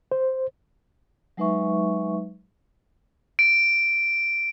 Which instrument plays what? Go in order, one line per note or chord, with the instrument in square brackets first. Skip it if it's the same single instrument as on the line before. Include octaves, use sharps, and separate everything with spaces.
[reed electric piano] C5
[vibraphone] F#3 G#3 D#4 B4 E5 C#6
[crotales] D7